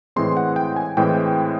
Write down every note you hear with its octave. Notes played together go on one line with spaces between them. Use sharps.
A2 E3 G#3 C4 C6
F#5
G5
G#5
A2 E3 G#3 C4 G5